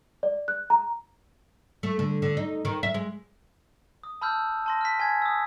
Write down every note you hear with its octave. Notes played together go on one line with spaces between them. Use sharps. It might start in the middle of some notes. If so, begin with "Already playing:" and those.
D5
F#6
A#5
A3
D3
D3
D#4
D#3
E5
G#3
D#6
A5 B5 E6 F6 G6
A5 C6 A#6
F6 B6
G#5 G#6
D#6 E6